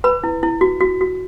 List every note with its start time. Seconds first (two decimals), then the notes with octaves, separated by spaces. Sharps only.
0.04 B4 B5
0.24 E4
0.43 E4
0.61 F#4
0.80 F#4
1.01 F#4